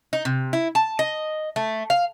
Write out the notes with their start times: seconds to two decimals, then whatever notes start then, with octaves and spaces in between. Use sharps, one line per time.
0.13 D#4
0.25 C3
0.53 E4
0.75 A5
0.99 D#5
1.56 A3
1.90 F5